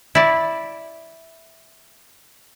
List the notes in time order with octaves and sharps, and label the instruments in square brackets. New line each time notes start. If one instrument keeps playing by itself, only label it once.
[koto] E4 D5